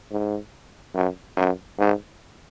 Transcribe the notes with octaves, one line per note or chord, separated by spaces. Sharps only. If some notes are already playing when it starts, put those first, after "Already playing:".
G#2
F#2
F#2
G#2